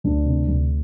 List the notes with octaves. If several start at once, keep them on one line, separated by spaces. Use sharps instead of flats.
D2 D4
C3
D2